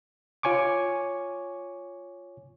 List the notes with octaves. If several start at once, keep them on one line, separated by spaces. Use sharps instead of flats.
F4 C#5 G#5 C#6 D6